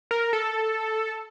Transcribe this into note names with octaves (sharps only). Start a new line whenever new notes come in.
A#4
A4